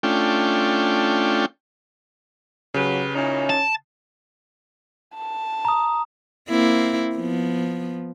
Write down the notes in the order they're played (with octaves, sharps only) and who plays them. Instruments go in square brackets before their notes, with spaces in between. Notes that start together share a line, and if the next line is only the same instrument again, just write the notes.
[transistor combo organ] A3 C#4 D4 F4 G5
[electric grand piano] C#3 [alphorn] F#3 [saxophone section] G4 B4
[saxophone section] A#2 D#4 E4 [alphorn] C#4
[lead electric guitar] A5
[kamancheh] A5
[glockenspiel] A#5 D#6
[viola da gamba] A#3 C4 E4
F3 B3